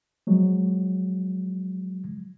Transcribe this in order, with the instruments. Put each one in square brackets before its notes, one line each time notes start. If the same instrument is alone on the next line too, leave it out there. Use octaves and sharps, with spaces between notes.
[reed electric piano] F3 F#3 G#3